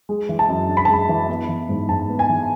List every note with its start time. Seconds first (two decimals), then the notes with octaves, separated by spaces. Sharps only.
0.09 G#3
0.29 E3
0.39 A5
0.49 F#2
0.69 D4
0.77 B5
0.85 A5
0.89 G#3 B5
1.09 E3
1.28 B3
1.49 E3
1.69 G#2
1.89 G#2 A5
2.09 B3
2.19 G#5
2.29 E3